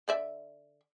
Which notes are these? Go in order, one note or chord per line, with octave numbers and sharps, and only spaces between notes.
D3 D5 E5